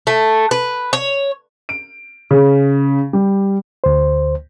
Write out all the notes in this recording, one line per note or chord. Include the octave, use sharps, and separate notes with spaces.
A3
B4
C#5
D7
C#3
G3
D2 C5